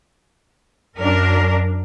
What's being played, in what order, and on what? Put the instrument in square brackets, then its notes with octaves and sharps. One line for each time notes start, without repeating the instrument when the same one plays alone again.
[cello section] F#2 D4 A#4